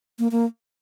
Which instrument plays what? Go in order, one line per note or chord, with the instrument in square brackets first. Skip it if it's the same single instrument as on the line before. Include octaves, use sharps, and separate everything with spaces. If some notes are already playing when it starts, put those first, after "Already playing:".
[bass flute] A#3
A#3